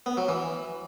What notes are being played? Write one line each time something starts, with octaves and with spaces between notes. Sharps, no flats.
B3
F#3
E3